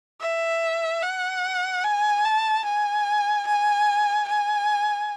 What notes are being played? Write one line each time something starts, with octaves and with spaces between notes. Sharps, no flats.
E5
F#5
G#5
A5
G#5
G#5
G#5